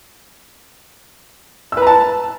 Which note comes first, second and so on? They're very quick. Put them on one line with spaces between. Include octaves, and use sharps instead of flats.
E6 B4 A#5 A5